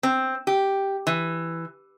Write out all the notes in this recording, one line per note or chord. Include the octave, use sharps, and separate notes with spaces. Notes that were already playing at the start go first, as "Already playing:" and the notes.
C4
G4
E3